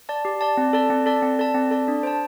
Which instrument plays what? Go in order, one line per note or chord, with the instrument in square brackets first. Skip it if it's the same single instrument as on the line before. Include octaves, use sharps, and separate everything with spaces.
[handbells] D5 A5
G4
D5 A5
C4
A4 D5 A5
C4
A4 D5 A5
C4
A4 D5 A5
C4
A4 D5 A5
D4
C5 A5